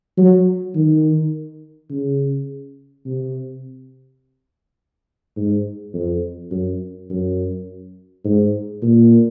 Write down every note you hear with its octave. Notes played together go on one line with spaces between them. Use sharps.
F#3
D#3
C#3
C3
G#2
F2
F#2
F#2
G#2
A#2